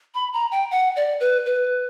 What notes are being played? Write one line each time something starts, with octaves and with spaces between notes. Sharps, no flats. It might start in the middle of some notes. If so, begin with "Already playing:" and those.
B5
A#5
G5
F#5
D5
B4
B4